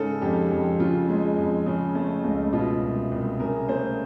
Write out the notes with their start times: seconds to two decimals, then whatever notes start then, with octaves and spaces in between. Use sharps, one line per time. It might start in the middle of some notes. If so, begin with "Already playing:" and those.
Already playing: G#2 C#3 A4
0.22 F2 G4
0.51 F2
0.80 C#3 F4
1.09 G#3
1.38 F2
1.66 C#3
1.95 A3
2.24 C#2
2.53 B2 F4
2.81 C2
3.11 C2
3.40 C#3 A#4
3.68 A3 C5